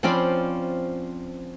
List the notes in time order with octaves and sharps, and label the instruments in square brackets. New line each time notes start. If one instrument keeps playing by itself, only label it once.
[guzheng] F3 C4 C#4 F4 D5 B5